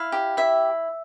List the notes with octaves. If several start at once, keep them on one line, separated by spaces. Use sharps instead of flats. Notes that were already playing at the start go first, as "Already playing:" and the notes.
Already playing: E4 F5
G4
E4 E5